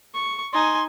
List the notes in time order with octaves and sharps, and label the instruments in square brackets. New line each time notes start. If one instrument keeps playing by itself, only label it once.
[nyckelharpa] C#6
[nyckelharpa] D#4 G#5 [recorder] C6